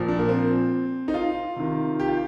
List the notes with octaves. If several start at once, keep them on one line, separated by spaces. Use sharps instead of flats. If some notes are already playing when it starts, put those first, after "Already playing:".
Already playing: A#2 F3
D4
A#3
C4
D#4
F4
C3 D#3
G4
F4